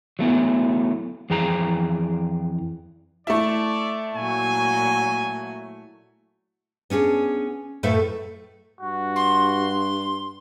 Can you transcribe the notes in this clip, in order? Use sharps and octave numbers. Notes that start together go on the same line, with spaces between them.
F#3 A3 B3 E4
F2 E3 G#4 G5 A#5
A3 E4 D5
A#2 F#3 G#5
B3 C#4 D4 G#4
F#2 A2 A3 A4 B4 E5
G2 F#4
C6